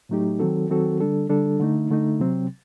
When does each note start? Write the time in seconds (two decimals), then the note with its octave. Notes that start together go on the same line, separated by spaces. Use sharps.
0.09 A2 F#3 A3 D#4 G4
0.39 D#3 F#3 C4 F#4 A4
0.70 D#3 F#3 C4 F#4 A4
1.00 D3 G3 D4 A4
1.30 D3 G3 D4 A4
1.60 D3 A3 D#4
1.90 D3 A3 D#4
2.20 C3 F#3 C4